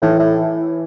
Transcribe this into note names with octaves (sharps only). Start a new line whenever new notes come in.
A2 E3
A2